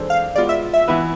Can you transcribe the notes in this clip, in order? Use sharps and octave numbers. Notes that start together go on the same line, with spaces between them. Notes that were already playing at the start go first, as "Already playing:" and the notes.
Already playing: E3 G#3 D4 A4 C5
F5
G#3 B3 F4 D5
E5
E5
E3 B3 E4 B4